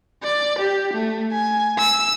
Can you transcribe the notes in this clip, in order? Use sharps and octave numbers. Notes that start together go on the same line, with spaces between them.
D5
G4
A3
G#5
E6